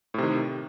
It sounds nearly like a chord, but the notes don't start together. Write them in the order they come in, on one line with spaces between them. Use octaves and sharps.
A2 C3 D#3